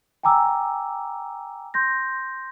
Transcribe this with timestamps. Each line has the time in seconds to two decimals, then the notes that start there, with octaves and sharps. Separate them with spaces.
0.23 G5 G#5 A#5 D6 E6
1.74 C6 G6 A#6